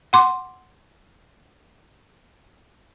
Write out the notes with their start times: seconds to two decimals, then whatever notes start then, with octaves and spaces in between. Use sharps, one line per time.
0.13 F#5 C6 D6